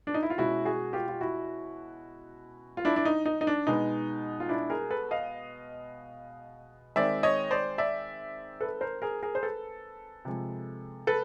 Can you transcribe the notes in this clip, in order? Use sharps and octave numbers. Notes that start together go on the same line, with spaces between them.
D4
D#4
E4
F4
B2 G#3 C#4 E4 F#4
F#4 G#4
F4 G4
F4
E4 F#4
F4
D4 E4
D4
D#4
D#4
D#4
D4
B2 G#3 B3 D#4
F4
D4 E4
G#4 A#4
A4 B4
D#5 F5
D#3 G#3 C4 D5 E5
C#5 D#5
C5 D5
D5 E5
A4 B4
A#4 C5
G#4 A#4
G#4 A#4
C5
A4 B4
C3 F3 G#3
A4 B4